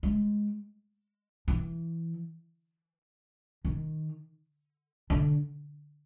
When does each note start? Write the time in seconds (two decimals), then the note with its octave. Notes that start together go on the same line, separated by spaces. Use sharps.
0.03 G#3
1.48 E3
3.65 D#3
5.10 D3